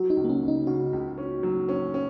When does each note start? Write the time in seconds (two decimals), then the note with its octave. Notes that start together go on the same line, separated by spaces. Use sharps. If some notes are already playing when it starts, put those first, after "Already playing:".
Already playing: F#3 F#4
0.10 D#4
0.17 C#2
0.24 A#3
0.29 C#4
0.43 C#3
0.48 D#4
0.67 C#3 F#4
0.93 C#2
1.18 C#4
1.43 F#3
1.69 C#4
1.94 C#4